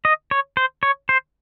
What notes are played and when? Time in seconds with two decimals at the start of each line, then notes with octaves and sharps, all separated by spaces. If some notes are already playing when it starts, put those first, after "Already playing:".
0.05 D#5
0.31 C#5
0.57 C5
0.83 C#5
1.09 C5